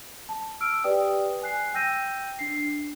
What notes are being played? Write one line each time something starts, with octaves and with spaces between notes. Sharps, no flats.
A5
E6 F6 D7
G4 B4 D5 G5 D#6
G#5 F#6 C7
G5 E6 G6 A#6 D#7
D4 C7